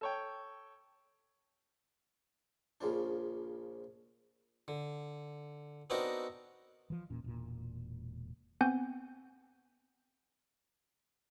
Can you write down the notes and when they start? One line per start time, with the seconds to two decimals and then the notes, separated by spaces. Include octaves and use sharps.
0.01 A4 C#5 G5
2.81 A#1 C#3 F3 D4
4.68 D3
5.90 B3 C4 D4 D#4 F#4 A#4
6.90 E3 F3
7.10 E1 A#2 C#4
7.24 E1 A#2
8.61 B3 C4 G#5 G6